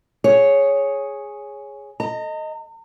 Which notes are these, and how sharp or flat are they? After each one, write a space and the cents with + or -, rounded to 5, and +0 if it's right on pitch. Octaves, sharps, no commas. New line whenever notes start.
G#4 +0 C#5 +0
D#5 +0 A#5 -40